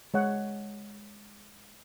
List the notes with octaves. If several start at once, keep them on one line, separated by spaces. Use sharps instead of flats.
G#3 C#5 F#5